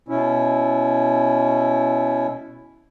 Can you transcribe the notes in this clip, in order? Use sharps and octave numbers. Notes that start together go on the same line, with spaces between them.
B2 C#4 E4